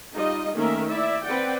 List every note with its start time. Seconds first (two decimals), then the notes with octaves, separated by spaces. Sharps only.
0.15 G3 D#4 F4 D#5
0.55 D#3 A3 A#3 C#4 A#4 E5
0.87 E4 D5 E5
1.25 C4 B4 D5 F#5 G5